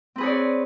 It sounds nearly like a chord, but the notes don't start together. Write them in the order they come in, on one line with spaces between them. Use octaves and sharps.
C4 B4 G#4 C#5 D5